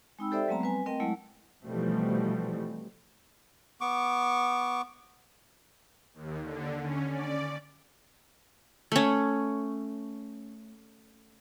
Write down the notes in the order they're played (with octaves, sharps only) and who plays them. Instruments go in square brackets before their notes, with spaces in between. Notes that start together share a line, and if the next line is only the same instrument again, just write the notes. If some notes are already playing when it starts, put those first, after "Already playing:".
[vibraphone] G#3 C4 D#4 G5 B5 E6
G4 A4 C5 D5 E5 G5
F#3 G#3 A3 B3 C4 A#5
G3 C4 B4 G#5
A3 C4 A#4 D#5 G5
F#3 G#3 A3 E4 F#5
[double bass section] B2 E3 F3 G3 A3 C4
[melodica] B3 C#6 D6
[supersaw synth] D#2
D3
C#4
D5
[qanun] A3 C#4